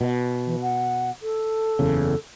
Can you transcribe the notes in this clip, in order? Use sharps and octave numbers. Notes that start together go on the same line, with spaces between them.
B2
E3
F#5
A4
F#1 E2 C#3